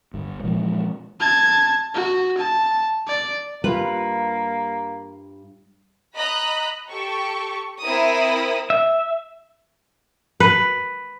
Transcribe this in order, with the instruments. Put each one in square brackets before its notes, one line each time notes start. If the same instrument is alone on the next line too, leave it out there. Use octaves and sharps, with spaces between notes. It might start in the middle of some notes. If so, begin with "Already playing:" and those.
[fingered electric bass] G1 G2
A#2 E3 F3 G#3
[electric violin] A5 G#6
F#4
A5
D5
[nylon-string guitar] G2 F4 [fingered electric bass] G3 [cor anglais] A#3 [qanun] B4
[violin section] D#5 A#5 B5 F#6 B6
G4 A4 C#6
C4 E4 A#4 D#6
[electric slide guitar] E5
[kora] B4